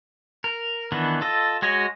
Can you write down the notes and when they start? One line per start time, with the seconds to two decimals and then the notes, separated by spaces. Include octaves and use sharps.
0.44 A#4
0.92 D#3 E3 B3 D4
1.21 F4 A4 D#5
1.62 G#3 F#4 C#5 D#5